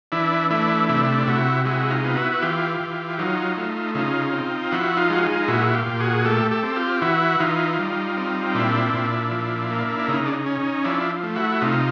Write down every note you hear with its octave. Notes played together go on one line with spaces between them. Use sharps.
E3 D4 E4
A3 D4 E4
C3 D4 E4
C3 E4 F#4
G#3 E4 F#4
D#4 F4
B3
E4 F#4
F#4
E3 F4 G4
E3
F#3 D#4 F4
A3
C#3 D#4 F4
C4
F3 E4 F#4
D#4 F4
G#3 F#4
D#4 F4
A#2 E4 F#4
F4 G4
A#2
F#4 G#4
A3 G4 A4
G4 A4
C4
F4 G4
E3 E4 F#4
E3 D#4 F4
G3
C4
A#2 D4 E4
A#2
F3
A#3
D4
C#3 D#4
D4
D#4
C#4
D#4
F3 D4 E4
A3
E4 F#4
C3 D#4 F4